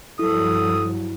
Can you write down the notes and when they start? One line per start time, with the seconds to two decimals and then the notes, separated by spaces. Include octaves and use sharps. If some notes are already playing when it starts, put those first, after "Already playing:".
0.19 G2 F3 F#3 E4 A4 D#6